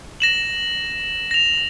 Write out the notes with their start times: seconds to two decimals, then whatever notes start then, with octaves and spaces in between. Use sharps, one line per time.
0.20 A#6 E7 F#7
1.31 A#6 F7